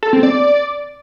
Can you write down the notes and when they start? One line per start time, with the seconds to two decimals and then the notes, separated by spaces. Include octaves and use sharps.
0.03 A4
0.13 C4
0.23 D5